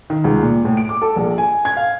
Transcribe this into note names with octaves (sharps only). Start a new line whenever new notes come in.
D#3
C#2
A#2
A2
D7
D6
A4
A#1
G#5
G#6
F5